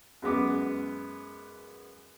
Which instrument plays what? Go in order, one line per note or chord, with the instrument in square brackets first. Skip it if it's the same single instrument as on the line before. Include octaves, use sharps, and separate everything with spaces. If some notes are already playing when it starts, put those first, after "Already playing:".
[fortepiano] F#2 G#3 B3 D6